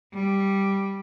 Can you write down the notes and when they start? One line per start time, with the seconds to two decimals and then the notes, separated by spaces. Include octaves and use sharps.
0.14 G3